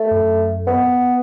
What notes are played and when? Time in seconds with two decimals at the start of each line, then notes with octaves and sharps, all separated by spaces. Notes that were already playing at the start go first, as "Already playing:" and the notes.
Already playing: A3
0.11 F#2
0.67 B3